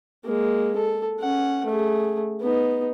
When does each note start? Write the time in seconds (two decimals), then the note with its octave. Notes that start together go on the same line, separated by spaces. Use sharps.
0.25 G#3 A#3
0.76 A4
1.20 C#4 F#5
1.66 A3 G#4
2.41 B3 D#4